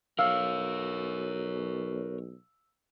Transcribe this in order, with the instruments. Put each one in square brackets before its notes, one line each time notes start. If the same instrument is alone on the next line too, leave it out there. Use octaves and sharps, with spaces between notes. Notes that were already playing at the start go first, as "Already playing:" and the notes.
[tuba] B1 [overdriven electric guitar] A#4 C#5 [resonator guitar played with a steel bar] F5 [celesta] E6